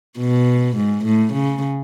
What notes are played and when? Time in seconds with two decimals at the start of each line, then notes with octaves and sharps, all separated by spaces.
0.18 B2
0.77 G#2
1.05 A2
1.33 C#3